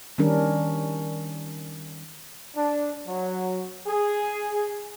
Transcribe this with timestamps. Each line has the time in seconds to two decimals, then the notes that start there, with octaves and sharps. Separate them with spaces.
0.18 D#3 G3 C#4 D4 A#4
2.56 D4
3.06 F#3
3.87 G#4